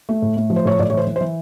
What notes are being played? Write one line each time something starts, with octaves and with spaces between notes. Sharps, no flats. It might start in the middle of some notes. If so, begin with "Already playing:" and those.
A3
A2
A3
F3
C5
A2 C#5
A2 D5
C#5
E3 C5
E3
C5
E3